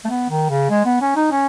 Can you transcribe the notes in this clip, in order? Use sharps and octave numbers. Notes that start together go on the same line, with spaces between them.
A3
B3
D#3
C#3
G#3
B3
C#4
D#4
C#4